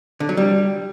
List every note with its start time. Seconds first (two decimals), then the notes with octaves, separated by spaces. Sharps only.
0.20 D3
0.29 F#3
0.37 G3